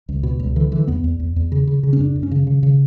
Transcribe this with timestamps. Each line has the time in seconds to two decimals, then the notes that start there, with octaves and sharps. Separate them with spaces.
0.09 C#2
0.23 B2
0.39 C#2
0.56 D3 E3
0.72 D3 E3
0.87 E2 B3
1.04 E2
1.20 E2
1.36 E2
1.52 C#3
1.67 C#3
1.83 C#3
1.93 C#4
2.00 F#2 D4
2.16 F#2
2.23 C#4
2.31 C#3
2.47 C#3
2.63 C#3